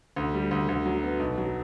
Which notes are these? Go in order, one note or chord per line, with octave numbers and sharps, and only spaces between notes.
D2
G3
D2
D2
F#3
B3
B1
F#3